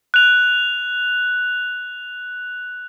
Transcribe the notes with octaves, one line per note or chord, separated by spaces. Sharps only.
F#6 F7